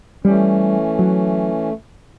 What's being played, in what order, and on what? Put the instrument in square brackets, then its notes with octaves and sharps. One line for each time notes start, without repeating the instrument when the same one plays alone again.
[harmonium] E3 A3 C#4 [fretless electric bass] G3
[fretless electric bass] F#3